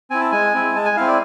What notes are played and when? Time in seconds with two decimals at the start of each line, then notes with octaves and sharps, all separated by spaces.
0.10 C4 E4 G#5
0.21 A5
0.32 G#3 G#5
0.54 C4 E4
0.75 G#3 A5
0.85 G#5
0.96 C4 E4 F5
1.08 D5